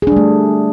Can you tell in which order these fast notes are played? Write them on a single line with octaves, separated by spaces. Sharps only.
G#4 D4 G3 A3